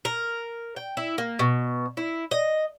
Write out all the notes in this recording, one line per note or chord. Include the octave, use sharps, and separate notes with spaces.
A#4
G5
E4
A#3
B2
E4
D#5